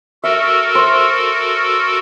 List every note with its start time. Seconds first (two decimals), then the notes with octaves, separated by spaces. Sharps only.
0.24 F#4 A4 A#4 E5
0.75 C5